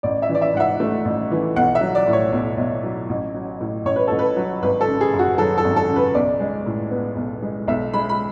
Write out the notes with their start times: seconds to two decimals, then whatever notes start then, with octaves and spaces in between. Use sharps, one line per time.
0.03 A1 D5
0.22 E5
0.29 E3
0.35 D5
0.41 E5
0.54 G#2 F#5
0.60 E5
0.80 A3
1.05 A1
1.31 E3
1.56 B1 F#5
1.75 E5
1.81 F#3
1.95 D5
2.07 A2
2.13 C#5
2.32 B1
2.57 B1
2.84 F#3
3.09 A1
3.35 F#3
3.61 A2
3.85 A1 C#5
3.96 B4
4.07 A1 A4
4.19 B4
4.36 F#3
4.62 G#1 B4
4.81 A4
4.87 C#3
5.01 G#4
5.13 F#2
5.19 F#4
5.38 F#3 A4
5.58 A4
5.64 G#1
5.76 A4
5.89 C#3
5.96 B4
6.15 B1 D5
6.40 G#3
6.66 A2
6.91 B3
7.16 B1
7.42 G#3
7.68 B1 E5
7.93 G#3 B5
8.09 B5